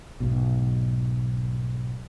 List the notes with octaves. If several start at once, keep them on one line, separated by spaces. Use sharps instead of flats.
B1 G#2 B2